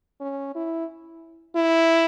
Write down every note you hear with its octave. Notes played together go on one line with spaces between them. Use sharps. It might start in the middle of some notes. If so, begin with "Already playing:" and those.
C#4
E4
E4